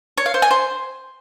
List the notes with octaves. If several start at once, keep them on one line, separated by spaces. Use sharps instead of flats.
C#5
F5
C5
G#5
C5